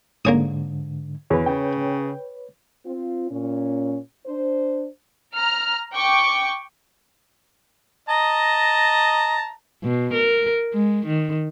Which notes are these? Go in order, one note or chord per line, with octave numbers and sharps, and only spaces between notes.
G#2 D3 A#3 C#4 D#6
E2 B4 C#5
C#3 G5
C4 F4
A#2 C#4
D4 C5
A#5 F6
G5 C#6 D6
D#5 A5 A#5
B2
A#4
G#3
D#3